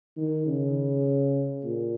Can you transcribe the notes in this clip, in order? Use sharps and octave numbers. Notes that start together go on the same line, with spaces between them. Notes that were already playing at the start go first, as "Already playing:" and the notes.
D#3
C#3
A#2